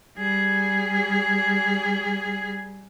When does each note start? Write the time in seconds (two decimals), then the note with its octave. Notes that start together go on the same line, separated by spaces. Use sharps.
0.18 G3 G#4